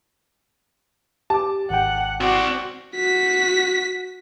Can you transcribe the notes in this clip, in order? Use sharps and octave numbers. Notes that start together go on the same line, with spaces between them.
G4 A5 D6
G#1 F#5 G5
C4 F#4 D5
F#4 B6